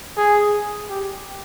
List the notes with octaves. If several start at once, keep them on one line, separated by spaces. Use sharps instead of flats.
G#4
G4